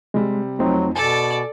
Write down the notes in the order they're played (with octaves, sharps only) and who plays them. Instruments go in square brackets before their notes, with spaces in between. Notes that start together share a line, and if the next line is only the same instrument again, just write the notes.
[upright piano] C3 G3 [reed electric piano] G#3
[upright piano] F2 [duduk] F#3 [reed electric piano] A3 C4 D#4
[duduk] B2 [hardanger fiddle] A4 D5 [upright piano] G#5 [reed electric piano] A5